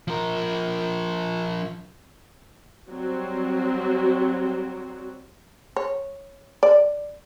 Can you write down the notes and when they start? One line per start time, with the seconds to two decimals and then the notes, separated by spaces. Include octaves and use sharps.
0.08 F3 A#4
2.89 F#3 G3 C4 F#4
5.76 C#5
6.63 D5